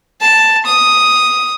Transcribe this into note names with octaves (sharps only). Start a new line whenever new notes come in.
A5
D#6